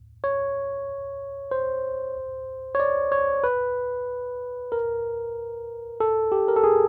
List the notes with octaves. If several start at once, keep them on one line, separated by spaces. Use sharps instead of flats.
C#5
C5
C#5
D5
C#5
B4
A#4
A4
G4
A#4
A4
G#4